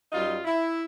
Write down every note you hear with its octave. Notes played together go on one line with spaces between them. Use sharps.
F#2 G3 D#4 F4
E4